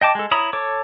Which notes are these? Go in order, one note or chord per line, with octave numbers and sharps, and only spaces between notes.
D#5 G5 A5 D6
G#3 A4
E4 C#5 A#5 B5 D#6
A4 C#5 D6